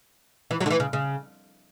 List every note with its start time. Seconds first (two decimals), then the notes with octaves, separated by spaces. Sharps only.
0.51 E3
0.60 F#3
0.66 D3
0.70 E3
0.80 C#3
0.93 C#3